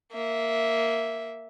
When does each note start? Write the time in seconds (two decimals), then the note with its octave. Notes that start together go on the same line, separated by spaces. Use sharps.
0.12 A#3 E5